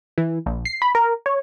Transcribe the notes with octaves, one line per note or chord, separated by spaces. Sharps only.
E3
A#1
C7
B5
A#4
C#5